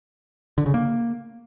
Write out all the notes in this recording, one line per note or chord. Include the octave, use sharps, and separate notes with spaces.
D3
C#3
A#3